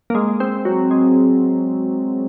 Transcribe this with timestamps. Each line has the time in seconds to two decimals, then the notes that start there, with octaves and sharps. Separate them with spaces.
0.10 A#3
0.15 G#3
0.40 C4
0.65 F#3
0.91 G#3